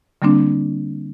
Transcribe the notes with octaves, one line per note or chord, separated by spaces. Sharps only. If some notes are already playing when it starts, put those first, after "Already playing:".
D3 G3 A#3 C4 D4